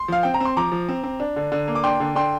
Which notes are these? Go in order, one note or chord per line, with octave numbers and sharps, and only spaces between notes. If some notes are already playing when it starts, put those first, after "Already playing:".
Already playing: C6
F3 F5
C4 G5
A#5
C4 C6
F3 A#5 D6
F3
C4
C4
D4
D3
D3
A#3
D6
D4 G5 C6
D3
D3 G5 C6